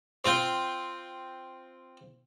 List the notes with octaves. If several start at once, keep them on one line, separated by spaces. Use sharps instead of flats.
C4 F4 G5